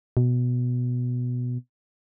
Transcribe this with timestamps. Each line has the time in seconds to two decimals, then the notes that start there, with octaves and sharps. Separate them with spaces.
0.17 B2